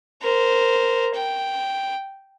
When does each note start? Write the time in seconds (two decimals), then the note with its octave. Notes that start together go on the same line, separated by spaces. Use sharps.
0.22 A#4 C5
1.15 G5